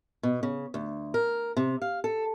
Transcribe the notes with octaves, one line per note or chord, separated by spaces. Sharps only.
B2
C#3
D2
A#4
C3
F5
A4